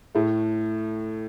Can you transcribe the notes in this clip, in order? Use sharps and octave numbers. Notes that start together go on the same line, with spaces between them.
A2 A3